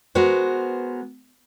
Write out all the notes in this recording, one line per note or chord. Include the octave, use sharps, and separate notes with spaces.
G#3 B3 F#4 A#4 C5